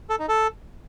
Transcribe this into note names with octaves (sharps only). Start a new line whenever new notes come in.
A4
D#4
A4